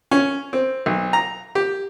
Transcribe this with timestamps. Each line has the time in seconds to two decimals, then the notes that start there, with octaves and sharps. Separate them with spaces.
0.11 C#4
0.53 C4
0.86 B1
1.13 A#5
1.55 G4